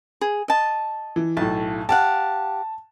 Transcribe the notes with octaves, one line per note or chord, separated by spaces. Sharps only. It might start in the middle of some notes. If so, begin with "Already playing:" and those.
G#4
D#5 A5
E3
B1 A2 A5
G4 F5 F#5 A5